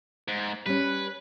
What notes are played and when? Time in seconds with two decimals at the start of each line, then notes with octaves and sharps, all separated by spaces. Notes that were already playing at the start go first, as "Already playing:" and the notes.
0.28 G#2
0.66 G3 C#4 B4